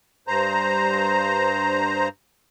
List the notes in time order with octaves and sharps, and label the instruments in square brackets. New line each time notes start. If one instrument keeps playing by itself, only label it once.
[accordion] G2 C5 A#5